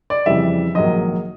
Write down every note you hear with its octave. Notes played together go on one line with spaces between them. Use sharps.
D5
F2 C#3 E3 G3 E5
A#1 G#2 D#3 F#3 A#3 D#5